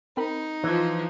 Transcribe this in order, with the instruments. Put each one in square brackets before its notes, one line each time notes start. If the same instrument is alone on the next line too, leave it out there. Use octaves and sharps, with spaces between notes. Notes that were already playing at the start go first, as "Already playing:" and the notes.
[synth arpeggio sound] C4 A#4 B5 [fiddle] D#4
[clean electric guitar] E3 [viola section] F3